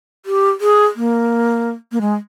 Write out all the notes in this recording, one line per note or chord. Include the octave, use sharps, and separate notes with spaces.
G4
G#4
A#3
A#3
G#3